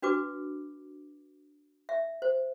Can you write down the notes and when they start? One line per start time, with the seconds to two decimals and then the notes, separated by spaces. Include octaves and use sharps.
0.02 D4 F#4 B4 D6
1.89 E5
2.22 C5